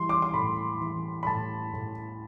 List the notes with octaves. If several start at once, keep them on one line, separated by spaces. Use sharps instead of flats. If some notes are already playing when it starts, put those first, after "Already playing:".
Already playing: E3 G3 C6
D6
C6
A2 B5
E3
B5
A2 A5
A2